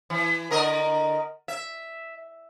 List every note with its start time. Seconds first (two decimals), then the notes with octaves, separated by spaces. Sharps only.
0.10 E3
0.51 D3 A#4 D#5
1.48 E5